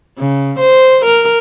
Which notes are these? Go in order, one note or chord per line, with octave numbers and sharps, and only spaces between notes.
C#3
C5
A#4